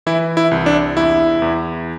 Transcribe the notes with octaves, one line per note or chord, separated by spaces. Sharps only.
E3 E4
E4
C2
D4
E2 E4
E2